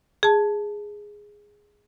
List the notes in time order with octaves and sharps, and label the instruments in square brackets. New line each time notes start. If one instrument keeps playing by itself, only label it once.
[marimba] G#4 A5